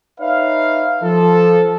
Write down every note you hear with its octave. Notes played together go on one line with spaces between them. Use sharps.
D#4 B4 C#5 E5 F5
F3 A4